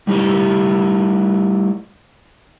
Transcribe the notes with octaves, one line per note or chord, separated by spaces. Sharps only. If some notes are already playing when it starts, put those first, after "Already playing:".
G3 A3 E4 G4 D#5